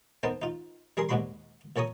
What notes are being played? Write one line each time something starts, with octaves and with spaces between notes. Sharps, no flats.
B3 D#4 A#4 C5 A5
D#4 F4
G3 G#4 A#4 C6
D#2 G#2 D4 F#4 B5 C6
A#2 A4 C#5 A#5 D#6